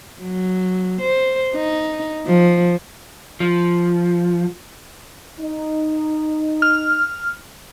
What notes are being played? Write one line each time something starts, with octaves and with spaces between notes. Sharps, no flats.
F#3
C5
D#4
F3
F3
D#4
F6